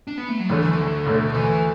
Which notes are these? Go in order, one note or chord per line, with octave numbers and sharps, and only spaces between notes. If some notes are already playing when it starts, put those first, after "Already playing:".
D4
B3
A3
F#3
D2 D3 E3 A3
E3
D3
D2 B2 D3 A3
E3